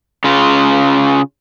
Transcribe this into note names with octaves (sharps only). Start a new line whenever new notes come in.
C#3 F4